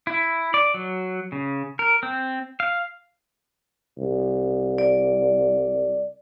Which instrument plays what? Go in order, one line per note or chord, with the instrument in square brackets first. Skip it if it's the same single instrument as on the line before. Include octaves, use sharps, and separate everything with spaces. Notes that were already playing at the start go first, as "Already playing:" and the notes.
[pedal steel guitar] E4
D5
F#3
C#3
A#4
C4
F5
[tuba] C2
[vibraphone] D5